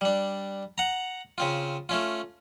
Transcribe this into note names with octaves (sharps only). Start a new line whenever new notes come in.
G3 D4
F#5 A#5
C#3 C4 F4
A3 C#4 F4